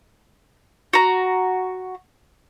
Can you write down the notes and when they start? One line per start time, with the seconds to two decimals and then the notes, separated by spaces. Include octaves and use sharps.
0.93 F#4 A#5